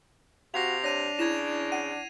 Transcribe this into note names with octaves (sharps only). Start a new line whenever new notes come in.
C3 F#4 F5 A#6 C7 F7
D4 C#5 A#6 D#7 F7
C#3 E4 G#6 A#6 E7
F#5 D#7